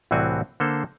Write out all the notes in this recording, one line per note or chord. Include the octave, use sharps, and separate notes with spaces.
C2 A2 E3 C4 F#4 G#5
D3 A#3 A4 C5